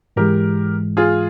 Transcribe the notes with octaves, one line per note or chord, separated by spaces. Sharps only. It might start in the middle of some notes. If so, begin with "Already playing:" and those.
G#2 E3 G#3 G4 A#4
F4 G#4